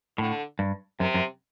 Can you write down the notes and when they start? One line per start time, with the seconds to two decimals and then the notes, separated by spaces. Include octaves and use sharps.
0.18 A2 D3
0.59 G2
1.00 F#2 C3
1.14 F#2